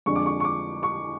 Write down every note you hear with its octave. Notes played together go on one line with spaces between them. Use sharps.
F2 D3 G#3 D4 C#6
D6
C#6
C#6
D6
C#6